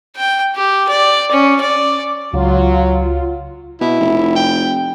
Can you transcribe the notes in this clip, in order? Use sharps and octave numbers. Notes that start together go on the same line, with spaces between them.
G5
G4
D5
C#4
D5
C#2 F#3 F4
B2 E4
F1
G5